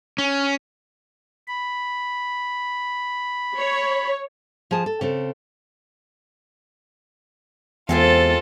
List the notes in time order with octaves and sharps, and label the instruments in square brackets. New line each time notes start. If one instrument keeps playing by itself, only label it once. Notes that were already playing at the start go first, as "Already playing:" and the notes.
[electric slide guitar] C#4
[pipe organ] B5
[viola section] C#5
[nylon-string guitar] F3 G#4 A5
A4
C#3 C4 A4
[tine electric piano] E2 [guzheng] G#3 C4 G4 [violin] F4 A4